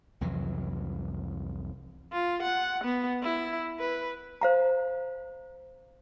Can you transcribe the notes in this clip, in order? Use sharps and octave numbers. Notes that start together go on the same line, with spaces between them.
C2 F2 E3 F#3
F4
F#5
B3
E4
B4
C5 F5 A#5